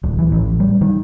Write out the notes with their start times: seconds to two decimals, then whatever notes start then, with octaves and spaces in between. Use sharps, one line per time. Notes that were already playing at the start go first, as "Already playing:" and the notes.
0.03 D1
0.19 E3
0.32 A1
0.60 G3
0.81 D#3